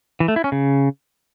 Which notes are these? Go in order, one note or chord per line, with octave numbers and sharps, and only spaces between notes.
E3
A3
E4
C#4
C#3